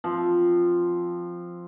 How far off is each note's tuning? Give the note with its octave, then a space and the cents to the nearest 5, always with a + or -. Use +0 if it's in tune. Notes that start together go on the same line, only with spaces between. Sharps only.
F3 +0 C4 +0